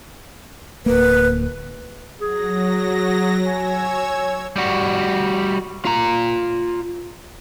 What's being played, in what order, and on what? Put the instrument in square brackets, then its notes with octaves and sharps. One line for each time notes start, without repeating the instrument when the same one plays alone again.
[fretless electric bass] D1 A#3 [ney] B4
[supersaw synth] F#3 A#6 [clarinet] G#4
[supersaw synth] C#5 E6 G#6 [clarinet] G#5
[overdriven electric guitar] G3 F#4
F4 A#5